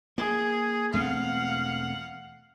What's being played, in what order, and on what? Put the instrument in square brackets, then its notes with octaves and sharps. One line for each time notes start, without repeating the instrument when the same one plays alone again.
[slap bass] A#3 [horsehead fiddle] G#4
[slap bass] E1 A3 C4 [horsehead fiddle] F5 F#5